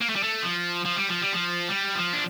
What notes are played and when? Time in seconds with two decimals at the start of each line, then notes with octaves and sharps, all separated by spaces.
0.01 A#3
0.09 A3
0.15 G3
0.23 A3
0.43 F3
0.85 F3
0.96 G3
1.09 F3
1.21 G3
1.33 F3
1.69 G3
1.95 F3
2.13 D4